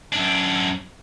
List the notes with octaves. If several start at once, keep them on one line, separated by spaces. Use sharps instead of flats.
F#2 D4